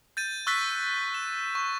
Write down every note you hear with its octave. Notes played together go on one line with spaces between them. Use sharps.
G6 A6 D#7
C#6 E6 F#6 A6 B6
E7
C#6